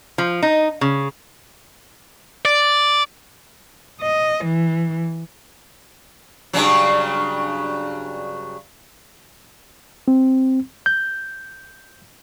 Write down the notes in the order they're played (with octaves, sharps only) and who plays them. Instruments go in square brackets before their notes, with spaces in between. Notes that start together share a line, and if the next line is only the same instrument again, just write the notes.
[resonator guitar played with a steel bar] F3
D#4
C#3
[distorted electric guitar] D5
[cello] D#5
E3
[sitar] G2 C#3 F#3
[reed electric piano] C4
G6